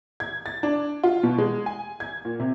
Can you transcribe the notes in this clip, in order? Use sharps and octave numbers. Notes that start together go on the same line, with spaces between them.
G#6
A6
D4
F4
B2
G#3
G#5
G#6
A#2
C3